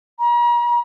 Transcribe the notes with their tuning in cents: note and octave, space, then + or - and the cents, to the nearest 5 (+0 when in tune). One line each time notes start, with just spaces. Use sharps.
A#5 +45